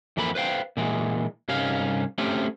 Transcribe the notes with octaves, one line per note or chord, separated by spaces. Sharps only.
F2 E3 A#3 C4 B5
B4 C5 F5 G5
A#2 E3 G#3
C2 G2 C#4 D#4 F5
A3 C4 C#4 G4